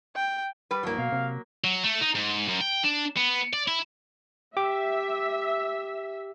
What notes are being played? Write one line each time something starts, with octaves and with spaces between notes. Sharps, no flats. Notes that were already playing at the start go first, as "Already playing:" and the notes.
G5
G3 B4
C2 G2 F3 F#3 A#3
B2 F5
C3
F#3
A3
D#4
G#2
F#2
G5
D4
B3
D5
E4
G4 E5 D6